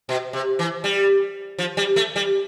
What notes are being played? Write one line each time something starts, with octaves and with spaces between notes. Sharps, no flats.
B2
C3
E3
G3
F3
G3
A3
G3